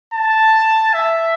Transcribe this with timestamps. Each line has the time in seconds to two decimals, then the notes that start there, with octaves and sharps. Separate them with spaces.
0.14 A5
0.94 E5